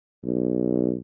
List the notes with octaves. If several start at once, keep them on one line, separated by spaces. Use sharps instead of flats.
B1